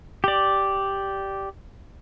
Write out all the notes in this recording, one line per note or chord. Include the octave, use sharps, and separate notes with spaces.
G4 D5